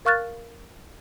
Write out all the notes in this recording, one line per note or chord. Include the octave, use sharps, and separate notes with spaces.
A#4 F5 C#6 F6 F#6 A6